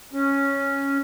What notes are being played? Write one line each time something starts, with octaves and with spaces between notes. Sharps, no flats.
C#4